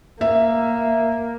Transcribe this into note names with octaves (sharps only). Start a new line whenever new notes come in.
A#3 E5